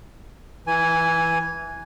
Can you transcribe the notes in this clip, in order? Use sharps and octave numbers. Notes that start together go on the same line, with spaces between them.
E3 G#5